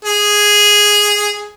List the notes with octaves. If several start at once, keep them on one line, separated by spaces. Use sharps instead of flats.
G#4